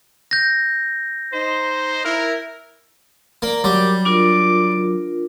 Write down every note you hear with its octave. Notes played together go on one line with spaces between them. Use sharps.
G6 A#6
D#4 C5
E4 A#4
A#3 A#4 D5
F#3 G3 G4
D4 F4 A#4 D6